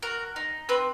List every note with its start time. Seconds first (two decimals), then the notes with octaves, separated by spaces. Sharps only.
0.03 F#4 A#4
0.36 D#4
0.69 C4 B4